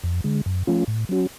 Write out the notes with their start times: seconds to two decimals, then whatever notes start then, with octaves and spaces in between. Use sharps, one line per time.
0.04 F2
0.24 D3 G#3
0.46 F#2
0.67 F3 A3 C#4 F4
0.88 A2
1.09 F#3 C#4 F#4